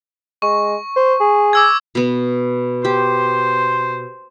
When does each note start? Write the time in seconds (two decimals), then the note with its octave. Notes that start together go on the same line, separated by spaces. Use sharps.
0.42 G#3 C#6
0.96 C5
1.20 G#4
1.53 D6 E6 G#6
1.95 B2 B3
2.85 G4 C5